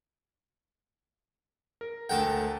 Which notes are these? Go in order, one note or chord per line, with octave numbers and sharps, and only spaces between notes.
A#4
D2 A4 A#4 F#5 G5 A5